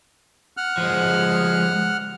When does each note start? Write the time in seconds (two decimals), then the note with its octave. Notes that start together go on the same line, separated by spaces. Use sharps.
0.57 F#5 F6 F#6
0.78 F3 G#3